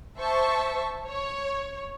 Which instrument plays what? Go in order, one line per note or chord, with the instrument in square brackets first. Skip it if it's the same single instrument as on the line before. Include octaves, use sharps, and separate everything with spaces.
[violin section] C5 E5 A5 C#6
C#5